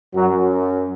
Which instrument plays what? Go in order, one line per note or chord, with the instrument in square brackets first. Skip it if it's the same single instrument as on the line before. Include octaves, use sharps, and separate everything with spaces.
[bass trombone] F#2 [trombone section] F#3